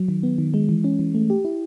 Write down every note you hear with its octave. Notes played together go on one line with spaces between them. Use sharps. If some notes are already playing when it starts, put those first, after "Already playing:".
Already playing: F#3
D#3
B3
D#3
G#3
E3
C#4
E3
A3
G4
E4